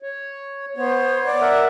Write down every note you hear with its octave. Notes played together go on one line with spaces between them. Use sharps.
C#5
B3 C5 C#5
D5
A#4 E5 F#5